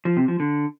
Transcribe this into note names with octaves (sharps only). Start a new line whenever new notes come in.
F3
C3
F3
D3